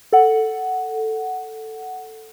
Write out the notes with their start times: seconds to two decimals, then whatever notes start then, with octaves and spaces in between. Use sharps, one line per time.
0.13 A4 F#5